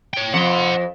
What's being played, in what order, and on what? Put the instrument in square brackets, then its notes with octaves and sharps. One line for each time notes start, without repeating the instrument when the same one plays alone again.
[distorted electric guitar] C#5 G5
[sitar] F2 [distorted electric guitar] F#5 C6